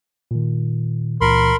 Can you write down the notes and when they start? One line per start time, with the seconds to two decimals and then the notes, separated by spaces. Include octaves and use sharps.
0.31 A#2 D#3
1.21 C#2 A#2 E3 A#4 B5 C6